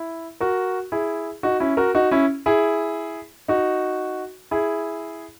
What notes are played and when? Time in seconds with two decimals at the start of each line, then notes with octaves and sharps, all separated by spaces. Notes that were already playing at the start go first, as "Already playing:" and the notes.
Already playing: E4
0.40 F#4 A#4
0.92 E4 G#4
1.43 D#4 F#4
1.60 C#4 E4
1.77 F#4 A#4
1.95 D#4 F#4
2.11 C#4 E4
2.46 E4 G#4
3.48 D#4 F#4
4.51 E4 G#4